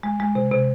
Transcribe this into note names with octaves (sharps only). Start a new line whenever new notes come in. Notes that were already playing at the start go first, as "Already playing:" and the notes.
G#3
G#3
C3
C3